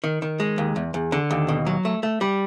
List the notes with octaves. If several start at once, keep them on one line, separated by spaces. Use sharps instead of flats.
D#3
D#3
G#3
D#2
E2
E2
D3
D#2
B2
F#3
A3
A3
G3